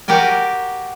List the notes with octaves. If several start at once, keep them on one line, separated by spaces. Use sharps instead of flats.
F#4 G4 A#4 G5 G#5